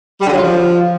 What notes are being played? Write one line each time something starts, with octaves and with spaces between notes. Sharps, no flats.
G3
D3
F#3
F4
F3